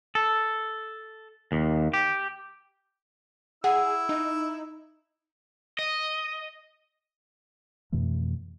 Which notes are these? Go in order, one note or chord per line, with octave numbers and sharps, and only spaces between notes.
A4
D#2
G4
E4 G#4 F#5 E6
D#4
D#5
F2 B2 E3 A3